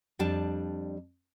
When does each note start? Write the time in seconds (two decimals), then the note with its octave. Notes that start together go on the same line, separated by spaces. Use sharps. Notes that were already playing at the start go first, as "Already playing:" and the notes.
0.19 F2 G3 D4 A5